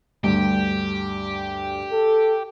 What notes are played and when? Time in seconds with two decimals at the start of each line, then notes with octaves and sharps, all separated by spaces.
0.24 D2 G2 G4
1.92 A4